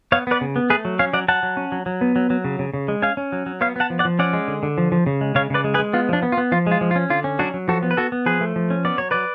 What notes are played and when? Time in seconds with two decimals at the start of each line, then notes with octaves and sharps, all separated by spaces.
0.12 B3 C#5 F5
0.27 B3 B4 D5
0.41 C#3
0.56 B3
0.70 A3 G#4 B4
0.85 F#3
0.99 C#4 C#5 F5
1.13 F#3 D5 F#5
1.28 F#3 F#5 A5
1.43 F#3
1.57 C#4
1.72 F#3
1.86 F#3
2.01 B3
2.16 F#3
2.30 F#3
2.45 C#3
2.59 C#3
2.74 C#3
2.88 G#3
3.02 C#4 F5 G#5
3.17 C#4
3.32 F#3
3.46 F#3
3.61 B3 C#5 F5
3.76 B3 F#5 A5
3.90 F3
3.99 D5 F#5
4.05 F3
4.19 C#4 D5 F#5
4.33 G#3
4.48 D3
4.63 D3
4.78 F3
4.92 F3
5.06 C#3
5.21 G#3
5.35 C#3 C#5 F5
5.50 C#3 B4 D5
5.64 G#3
5.74 G#4 B4
5.79 G#3
5.93 B3 F4
6.09 F3 D4
6.23 B3
6.32 F4
6.38 B3
6.52 F3 F4
6.67 G#3 F4
6.81 F3
6.91 F4
6.96 C#4
7.10 D3 F4
7.24 C#4
7.39 F#3 D4 F#4
7.54 F#3
7.68 F3 F#4 A4
7.83 B3
7.91 B4
7.97 B3 F#4 A4
8.12 B3
8.26 F3 G#4 B4
8.41 A3
8.56 F3
8.70 C#4
8.85 B3 D5
8.98 F#3 C#5
9.11 F#3 B4 D5